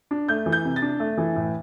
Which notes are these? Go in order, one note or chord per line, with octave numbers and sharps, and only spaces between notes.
D4
A3 G6
E3
G6
C3
A6
D4
A3
E3
A2